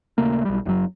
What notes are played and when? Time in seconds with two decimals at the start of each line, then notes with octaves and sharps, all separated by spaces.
0.18 D#1 C#3 A3 A#3
0.45 B1 G3
0.65 F#1 F#2 A#2 F#3